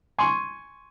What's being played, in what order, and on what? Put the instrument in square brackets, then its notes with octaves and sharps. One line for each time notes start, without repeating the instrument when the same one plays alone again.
[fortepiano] G#5 C6 C#6